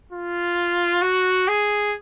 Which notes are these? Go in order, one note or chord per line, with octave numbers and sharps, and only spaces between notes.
F4
F#4
G#4